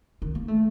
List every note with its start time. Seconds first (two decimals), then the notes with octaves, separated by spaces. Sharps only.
0.22 D#3
0.35 A#3
0.48 A3